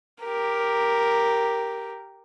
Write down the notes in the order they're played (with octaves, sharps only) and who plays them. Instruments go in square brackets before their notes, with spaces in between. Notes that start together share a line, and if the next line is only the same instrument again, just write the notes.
[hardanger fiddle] G4 A#4